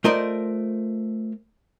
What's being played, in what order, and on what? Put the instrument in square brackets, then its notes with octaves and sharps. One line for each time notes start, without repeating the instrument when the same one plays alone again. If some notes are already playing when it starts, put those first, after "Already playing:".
[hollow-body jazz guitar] A3 F4 A#4 C5 D5 D#5